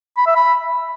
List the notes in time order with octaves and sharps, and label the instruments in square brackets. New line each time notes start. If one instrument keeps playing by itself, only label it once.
[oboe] B5
E5
B5